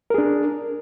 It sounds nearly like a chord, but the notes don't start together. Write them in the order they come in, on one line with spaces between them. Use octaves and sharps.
A#4 G#4 D4